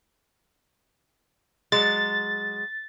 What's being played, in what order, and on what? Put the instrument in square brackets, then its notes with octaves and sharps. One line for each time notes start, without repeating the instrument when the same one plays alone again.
[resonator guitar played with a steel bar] F#3 G#3 [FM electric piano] A6